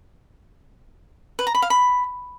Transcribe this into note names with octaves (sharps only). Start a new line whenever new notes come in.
B4
A#5
B5
F5
B5